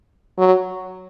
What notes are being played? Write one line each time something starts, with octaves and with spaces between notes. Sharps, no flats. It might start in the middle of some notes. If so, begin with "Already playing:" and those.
F#3